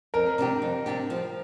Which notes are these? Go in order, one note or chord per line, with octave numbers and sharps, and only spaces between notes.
F2 A#4
C3 G3 D4 G4
F2
C3 G3 D4 G4
F3